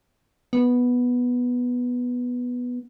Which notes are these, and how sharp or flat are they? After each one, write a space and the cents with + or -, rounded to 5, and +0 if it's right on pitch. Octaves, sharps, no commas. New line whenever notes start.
B3 -5